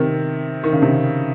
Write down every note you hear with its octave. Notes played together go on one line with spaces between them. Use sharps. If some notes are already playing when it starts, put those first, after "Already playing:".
Already playing: C3 D#3
D#3
C#3
C3